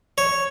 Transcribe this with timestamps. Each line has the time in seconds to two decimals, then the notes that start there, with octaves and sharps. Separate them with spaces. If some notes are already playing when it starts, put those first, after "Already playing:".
0.18 C#5